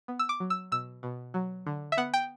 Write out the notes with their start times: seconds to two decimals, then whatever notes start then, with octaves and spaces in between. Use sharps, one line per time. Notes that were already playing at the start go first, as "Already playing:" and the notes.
0.08 B3
0.19 E6
0.29 D6
0.40 F#3
0.50 E6
0.72 B2 E6
1.03 B2
1.34 F#3
1.67 D3
1.92 E5
1.97 B3 F#5
2.14 G5